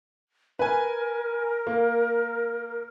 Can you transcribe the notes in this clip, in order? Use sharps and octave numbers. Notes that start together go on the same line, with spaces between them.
A#4 B4 G#5
A#3